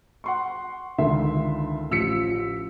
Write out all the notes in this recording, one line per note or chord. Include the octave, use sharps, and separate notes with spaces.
F#5 C6 C#6
C#2 D3 D#3 E5 C6
A1 F3 E6 B6 C#7